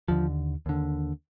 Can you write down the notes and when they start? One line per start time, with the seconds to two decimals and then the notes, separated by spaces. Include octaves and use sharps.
0.08 D#2 D3 F3
0.66 D#2 D3